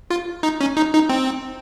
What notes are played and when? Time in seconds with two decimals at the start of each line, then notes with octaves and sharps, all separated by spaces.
0.10 F4
0.43 D#4
0.61 C#4
0.77 D#4
0.94 D#4
1.09 C4